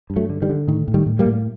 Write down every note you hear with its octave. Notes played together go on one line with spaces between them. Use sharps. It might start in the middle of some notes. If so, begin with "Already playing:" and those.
G2
F#3 A3
D3
D#3 G3
D3
A2 D#3
A2
D#3 G3
A2
G3 A#3
A2